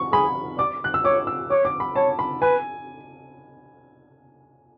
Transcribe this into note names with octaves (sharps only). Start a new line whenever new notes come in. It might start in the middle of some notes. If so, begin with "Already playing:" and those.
Already playing: C#6
G#4 B5
D5 D6
F#6
E6
C#5 D6
E6
C#5 D6
D6
B5
C#5 A5
B5
B4 G#5